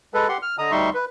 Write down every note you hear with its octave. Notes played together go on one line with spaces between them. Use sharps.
G#3 A4 B4
G4 F#5 C6
F6
D3 D#5 A#5 D#6
D2 G3 D#4 E5 C6 C#6
B4